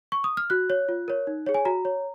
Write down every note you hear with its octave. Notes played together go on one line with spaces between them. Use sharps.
C#6
D#6
F6
F#4 F#6
C#5
F4
A#4 C#5
D#4
G#4 C#5
G#5
F#4 A#5
C#5